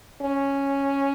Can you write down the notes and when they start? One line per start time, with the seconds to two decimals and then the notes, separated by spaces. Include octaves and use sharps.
0.22 C#4